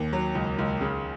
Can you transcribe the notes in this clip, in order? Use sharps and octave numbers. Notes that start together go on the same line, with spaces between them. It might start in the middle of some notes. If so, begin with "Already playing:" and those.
Already playing: D#2
F#3
C#2
C#2
C#3